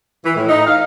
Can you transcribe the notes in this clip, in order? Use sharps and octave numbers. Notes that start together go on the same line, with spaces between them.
E3
A2
D#4
F5